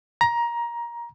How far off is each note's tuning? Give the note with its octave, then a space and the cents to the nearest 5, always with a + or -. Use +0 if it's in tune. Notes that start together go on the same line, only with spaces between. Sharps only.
A#5 +20